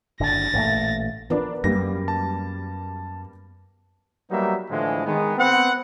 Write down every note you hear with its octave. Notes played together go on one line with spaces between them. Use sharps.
F#1 D3 A6 A#6
A1 A#2 A3
F3 B3 D4 A#4 B4
F#2 G3 A#3 A#6
A5
F#3 G3 A#3 B3 D#4 E5
A2 D3 E3 F3 G#3
D#3 G#3 B3
B3 C4 F#5